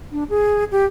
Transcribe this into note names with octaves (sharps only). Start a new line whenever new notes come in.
D4
G#4
G4